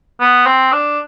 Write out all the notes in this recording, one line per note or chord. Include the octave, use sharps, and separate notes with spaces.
B3
C4
D4